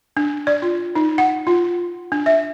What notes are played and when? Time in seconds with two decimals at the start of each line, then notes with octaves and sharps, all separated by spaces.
0.17 D4
0.47 D5
0.62 F4
0.95 D#4
1.18 F#5
1.47 F4
2.12 D4
2.26 E5